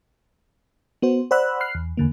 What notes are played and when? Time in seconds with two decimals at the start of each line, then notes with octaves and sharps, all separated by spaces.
1.02 B3 F#4 C5
1.31 C5 D5 F#5 B5 E6 F#6
1.60 B5 F6 F#6 C7
1.75 E2
1.97 E2 D3 A#3